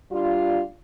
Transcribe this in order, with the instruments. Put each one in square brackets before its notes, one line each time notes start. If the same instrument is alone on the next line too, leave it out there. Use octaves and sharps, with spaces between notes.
[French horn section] G3 D4 F4